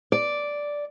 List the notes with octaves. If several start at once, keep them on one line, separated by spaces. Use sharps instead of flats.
D5